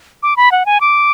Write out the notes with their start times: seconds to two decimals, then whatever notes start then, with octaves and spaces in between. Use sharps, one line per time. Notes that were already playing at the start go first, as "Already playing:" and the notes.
0.23 D6
0.37 B5
0.52 F#5
0.66 G#5
0.81 D6